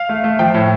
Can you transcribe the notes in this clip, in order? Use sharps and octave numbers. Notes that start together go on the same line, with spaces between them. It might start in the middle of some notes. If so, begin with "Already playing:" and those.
Already playing: F5
A3
A3
F3 G5
A2